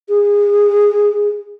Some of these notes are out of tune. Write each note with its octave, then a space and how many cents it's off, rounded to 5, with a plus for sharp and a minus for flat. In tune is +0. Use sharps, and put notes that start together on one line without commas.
G#4 -20